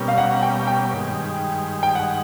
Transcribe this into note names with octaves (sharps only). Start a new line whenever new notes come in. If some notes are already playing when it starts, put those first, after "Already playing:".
Already playing: B2 G3 A#3 C#4
F5
F#5
G5
G5
G2 D#3 G#3
G5
F#5